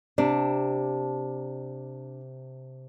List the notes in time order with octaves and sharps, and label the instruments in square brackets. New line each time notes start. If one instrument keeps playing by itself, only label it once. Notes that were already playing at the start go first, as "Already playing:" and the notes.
[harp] C3 [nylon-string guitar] D4